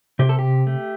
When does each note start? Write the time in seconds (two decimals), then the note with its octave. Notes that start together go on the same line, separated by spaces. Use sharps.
0.19 C3 G4
0.29 A4
0.39 G4
0.67 A3